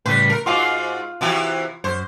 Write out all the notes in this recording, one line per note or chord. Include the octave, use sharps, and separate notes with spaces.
A2 C#3 G3 B4
A#4
G#2 F4 F#4 F5
C3 E3 F#4
F#2 C5